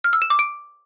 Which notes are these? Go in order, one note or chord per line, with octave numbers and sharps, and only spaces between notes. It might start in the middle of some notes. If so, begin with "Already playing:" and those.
F6
E6
E7
D6
D7